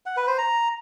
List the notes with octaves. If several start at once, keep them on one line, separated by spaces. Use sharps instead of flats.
F#5
B4
C5
A#5